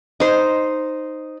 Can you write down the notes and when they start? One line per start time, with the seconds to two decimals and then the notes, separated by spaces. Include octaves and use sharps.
0.20 D#4 C5